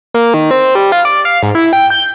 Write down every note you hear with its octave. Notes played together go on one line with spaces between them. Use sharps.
A#3
D#3
C4
G3
F4
D5
F5
G#2
E4
G5
G6